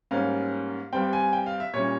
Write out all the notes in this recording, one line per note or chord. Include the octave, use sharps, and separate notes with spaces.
G#2 G3 A#3 C#4 F5
G2 G3 C4 G5
G#5
G5
F5
E5
A#2 G3 C#4 C#5